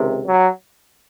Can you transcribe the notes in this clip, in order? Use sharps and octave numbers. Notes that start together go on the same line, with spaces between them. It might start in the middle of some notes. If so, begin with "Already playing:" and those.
Already playing: C#2 C3 D#3
F#3